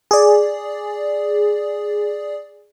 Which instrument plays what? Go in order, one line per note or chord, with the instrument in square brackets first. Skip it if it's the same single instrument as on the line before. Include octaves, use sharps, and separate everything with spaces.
[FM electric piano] G#4 D5